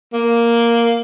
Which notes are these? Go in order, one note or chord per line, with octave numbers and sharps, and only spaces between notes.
A#3